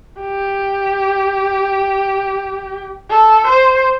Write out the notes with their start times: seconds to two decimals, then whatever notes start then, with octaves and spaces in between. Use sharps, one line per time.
0.21 G4
3.10 A4
3.47 C5